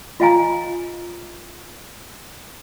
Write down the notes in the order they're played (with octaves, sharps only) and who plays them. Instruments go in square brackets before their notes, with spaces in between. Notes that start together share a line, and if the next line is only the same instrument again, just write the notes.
[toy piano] F4 D#5 F5 G#5 A#5